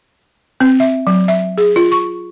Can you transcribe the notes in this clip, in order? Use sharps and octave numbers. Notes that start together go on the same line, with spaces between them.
C4
E5
F#3
E5
G#4
F4
C#6